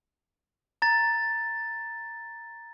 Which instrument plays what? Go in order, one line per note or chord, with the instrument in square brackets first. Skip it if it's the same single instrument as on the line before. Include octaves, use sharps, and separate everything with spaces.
[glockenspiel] A#5 A6